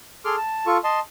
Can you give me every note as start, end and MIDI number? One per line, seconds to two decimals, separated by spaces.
0.25 0.36 68
0.25 0.36 69
0.25 0.36 84
0.25 0.36 86
0.25 0.36 89
0.37 0.66 81
0.67 0.78 65
0.67 0.78 69
0.67 0.78 85
0.84 1.00 75
0.84 1.00 81
0.84 1.00 84